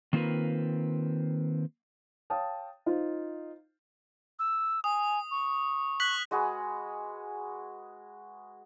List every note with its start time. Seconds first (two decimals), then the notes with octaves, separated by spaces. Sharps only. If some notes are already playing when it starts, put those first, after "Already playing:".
0.13 D#3 A#3 C4 F4 A#4 B4
2.30 C#5 F5 G5 A5 D#6
2.86 D#4 F4 C5 F5
4.39 E6
4.84 G#5 D#6
5.31 C#6
6.00 F#6 B6 F#7
6.31 G#3 F#4 G#4 B4